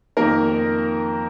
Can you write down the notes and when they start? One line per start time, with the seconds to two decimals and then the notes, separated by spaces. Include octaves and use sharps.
0.17 F2 D#3 A#3 A#4